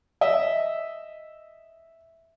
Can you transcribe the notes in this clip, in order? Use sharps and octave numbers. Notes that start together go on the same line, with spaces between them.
D#5 E5